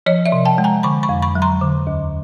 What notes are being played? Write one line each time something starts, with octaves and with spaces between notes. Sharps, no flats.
F3 C#5 D#5
D5 E5
C3
G5 A5
G#3
G#5 A#5
D3 B5 C#6
B5 C#6
F2
B5 C#6
F#3
A#5 C6
D3
D#2